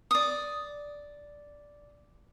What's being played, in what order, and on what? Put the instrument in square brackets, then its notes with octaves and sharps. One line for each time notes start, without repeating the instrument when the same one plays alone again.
[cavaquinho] D5 D#6